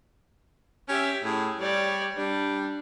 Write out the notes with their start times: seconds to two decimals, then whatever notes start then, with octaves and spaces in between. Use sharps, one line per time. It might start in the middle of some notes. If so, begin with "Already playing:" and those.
0.89 C#4 G4 E5
1.24 A2 G#4
1.60 G3 C#5 D5
2.17 G3 D4